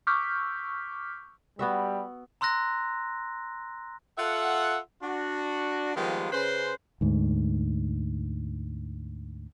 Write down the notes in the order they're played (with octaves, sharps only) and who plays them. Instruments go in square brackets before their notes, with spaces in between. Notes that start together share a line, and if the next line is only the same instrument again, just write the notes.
[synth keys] C#6 D6 E6 F6 G6 B6
[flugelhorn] G3 [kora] B3 F#4 E5
[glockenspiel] A#5 C6 E6 F#6 A#6
[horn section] F4 A4 E5 F#5
D4 F#4
D#3 F3 G3 G#3 A#3 B3
C#3 C#4 B4 C5 C6
[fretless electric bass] D2 G#2